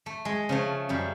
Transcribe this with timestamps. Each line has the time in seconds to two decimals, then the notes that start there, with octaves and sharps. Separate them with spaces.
0.06 A3
0.25 G#3
0.49 C#3 F3 A3
0.89 F#2 G3